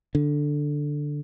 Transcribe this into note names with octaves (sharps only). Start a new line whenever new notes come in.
D3